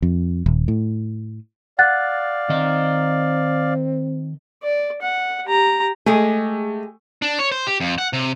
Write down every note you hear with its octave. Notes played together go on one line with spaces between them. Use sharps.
F2
D#1
A2
D5 F5 F#5 F#6 A6
D#3 C4 D#5
D5
F#5
G4 A#5
G#3 A3 G4 G#4
D4
C#5
C5
G4
F2
F#5
C3